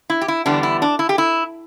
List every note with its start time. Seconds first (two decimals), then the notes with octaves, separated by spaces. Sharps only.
0.10 E4
0.21 G4
0.28 E4
0.46 E2 D3 G3 B3 D4
0.63 E4
0.82 D4
0.99 E4
1.09 G4
1.18 E4